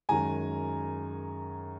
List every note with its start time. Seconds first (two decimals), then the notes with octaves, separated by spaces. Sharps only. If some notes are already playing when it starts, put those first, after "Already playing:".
0.09 F#2 D#3 G#3 G#5 A#5